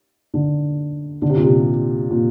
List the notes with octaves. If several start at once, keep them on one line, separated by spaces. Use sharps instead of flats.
D3
D3
C3
A#2
C3
A#2